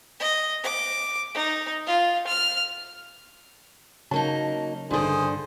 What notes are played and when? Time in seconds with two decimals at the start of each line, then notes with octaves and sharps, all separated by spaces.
0.20 D#5
0.64 D6
1.35 D#4
1.87 F4
2.27 F6
4.11 C#3 F#3 A#3 D#4 A5
4.91 A1 G2 D3 D#3 G#4 C5